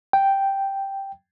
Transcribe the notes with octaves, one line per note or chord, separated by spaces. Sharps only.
G5